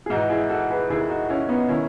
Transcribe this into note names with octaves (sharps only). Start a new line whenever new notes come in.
G#4
G#2 E3 D#4 F#4
E4 G#4
F#4 A4
G#4 B4
D#2 D#3 E4 G#4
D#4 F#4
C#4 E4
B3 D#4
D#3 C#4 E4